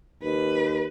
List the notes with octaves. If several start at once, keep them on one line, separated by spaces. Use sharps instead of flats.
D#2 B4